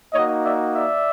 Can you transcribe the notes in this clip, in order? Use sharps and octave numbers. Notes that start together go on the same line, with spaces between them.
A#3 D#4 F#4 C#5 D#5
D5 E5
D5 E5